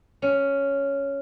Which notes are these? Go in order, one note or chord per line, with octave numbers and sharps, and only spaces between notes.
C#4